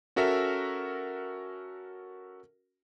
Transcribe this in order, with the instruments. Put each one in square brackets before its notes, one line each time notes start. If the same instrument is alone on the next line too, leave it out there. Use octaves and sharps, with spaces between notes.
[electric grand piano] C#4 F#4 A4 A#4 E5